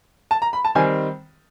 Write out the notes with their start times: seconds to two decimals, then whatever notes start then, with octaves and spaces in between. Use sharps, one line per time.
0.31 A5
0.42 A#5
0.53 B5
0.65 A5
0.75 D#3 G3 C4 G#5